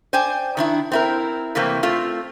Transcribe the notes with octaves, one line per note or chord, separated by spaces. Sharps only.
C5 D5 G5 G#5
D#3 D4 E4
C4 E4 A#4
C3 E3 G3 A3 A#3 C4
A3 C4 F4